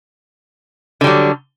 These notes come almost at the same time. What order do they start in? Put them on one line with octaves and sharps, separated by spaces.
D3 G3 F#3